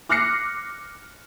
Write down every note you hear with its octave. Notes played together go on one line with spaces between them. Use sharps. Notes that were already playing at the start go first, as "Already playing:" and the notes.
D6 F6 F#6 A#6 C7 C#7